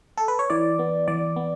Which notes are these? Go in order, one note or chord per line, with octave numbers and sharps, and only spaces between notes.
A4
B4
C#5
E3 D5
B3
E3 D5
B3